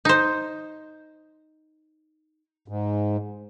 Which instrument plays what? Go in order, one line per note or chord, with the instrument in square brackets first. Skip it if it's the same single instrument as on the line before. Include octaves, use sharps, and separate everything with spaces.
[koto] D#4 C5
[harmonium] G#2